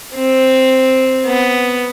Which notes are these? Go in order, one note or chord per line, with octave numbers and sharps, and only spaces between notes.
C4
B3